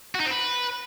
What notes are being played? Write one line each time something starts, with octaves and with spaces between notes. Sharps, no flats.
F#4
D#4
C4
B4